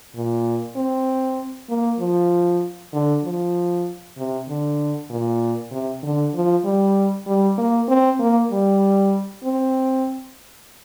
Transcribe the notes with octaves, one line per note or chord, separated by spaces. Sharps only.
A#2
C4
A#3
F3
D3
F3
C3
D3
A#2
C3
D3
F3
G3
G3
A#3
C4
A#3
G3
C4